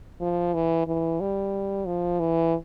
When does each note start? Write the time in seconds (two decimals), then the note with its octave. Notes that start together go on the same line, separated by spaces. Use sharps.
0.21 F3
0.54 E3
0.87 E3
1.21 G3
1.87 F3
2.20 E3